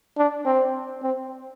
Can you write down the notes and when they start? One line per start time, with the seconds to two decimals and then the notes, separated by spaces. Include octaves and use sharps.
0.17 D4
0.46 C4
1.03 C4